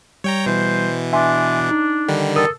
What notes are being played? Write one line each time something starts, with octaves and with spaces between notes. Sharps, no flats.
G3 C#5 G5 A#5
B2 E3 C5
D4 E5 G#5 C6
D#4
D3 D#3 G3
A4 A#4 D#6